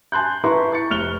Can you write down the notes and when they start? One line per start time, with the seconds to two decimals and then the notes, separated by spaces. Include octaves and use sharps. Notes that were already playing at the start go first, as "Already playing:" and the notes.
0.12 G#5 A5 C6 F#6 G6
0.44 E4 B4 E5 A#5 C6 C#6
0.72 C#6 A6 C#7
0.90 F1 F6 F#6 F7 G7